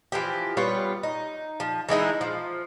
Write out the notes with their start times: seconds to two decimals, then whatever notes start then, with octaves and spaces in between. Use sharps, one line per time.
0.12 E3 F3 G4
0.57 G3 B3 F4 C#5
1.03 D#4
1.60 F3
1.89 E3 G#3 D#4 E4
2.21 F3